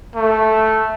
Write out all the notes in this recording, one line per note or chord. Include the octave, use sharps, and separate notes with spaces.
A3